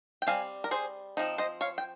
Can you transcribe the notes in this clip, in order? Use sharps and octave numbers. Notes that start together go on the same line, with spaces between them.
G5
G3 C4 F5 G#5
A#4
G#4 C5
F3 C4 D#4
C5 D#5
C#5 F5
G5